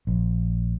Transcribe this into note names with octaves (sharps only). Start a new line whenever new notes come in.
A#1